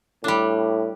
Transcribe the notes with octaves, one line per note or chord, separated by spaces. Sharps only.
A2 G3 D4